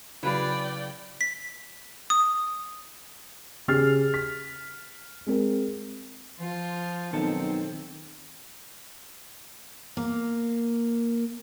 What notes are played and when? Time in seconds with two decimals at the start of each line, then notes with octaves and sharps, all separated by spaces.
0.23 C#3 F#3 E4 B4 D5 F5 G5
1.21 B6
2.10 D#6
3.68 C#3 G4 G#4 F6 A6 C7
4.14 B6
5.27 G#3 C4 A#4
6.40 F3 F4
7.13 B1 D#3 C4 A4 A5
9.97 A#3